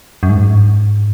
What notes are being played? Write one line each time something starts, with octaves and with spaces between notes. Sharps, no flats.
F#2
G#2